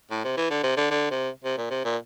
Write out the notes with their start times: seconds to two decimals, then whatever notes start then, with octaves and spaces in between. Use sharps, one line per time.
0.11 A2
0.24 C3
0.37 E3
0.50 D3
0.63 C3
0.77 D3
0.91 D3
1.11 C3
1.44 C3
1.58 A#2
1.70 C3
1.85 A#2